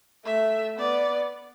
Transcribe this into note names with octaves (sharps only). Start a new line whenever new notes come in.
A3 E5
B3 D5